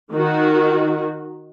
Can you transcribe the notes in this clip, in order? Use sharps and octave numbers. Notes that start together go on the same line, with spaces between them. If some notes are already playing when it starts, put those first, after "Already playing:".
D#3 F#4